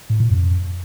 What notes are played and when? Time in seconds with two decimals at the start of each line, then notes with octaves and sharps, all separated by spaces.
0.10 A2
0.20 A#2
0.30 F2